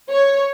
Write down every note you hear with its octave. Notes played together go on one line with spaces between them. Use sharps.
C#5